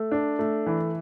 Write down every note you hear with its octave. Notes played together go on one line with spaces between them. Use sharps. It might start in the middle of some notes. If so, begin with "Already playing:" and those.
Already playing: A3
D4
A3
E3